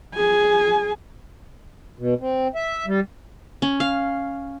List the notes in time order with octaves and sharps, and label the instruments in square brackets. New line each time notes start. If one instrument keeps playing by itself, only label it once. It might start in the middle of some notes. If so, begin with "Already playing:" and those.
[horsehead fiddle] G#4 G#5
[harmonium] B2
C4
E5
G3
[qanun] C#4
F5